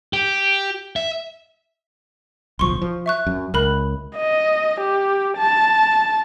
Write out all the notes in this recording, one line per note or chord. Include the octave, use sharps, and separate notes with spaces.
G4
E5
D1 B1 F3 C6 C#6
F3
E5 C#6 F#6
F#2
C#2 A#4 B5 F#6
D#5
G4
A5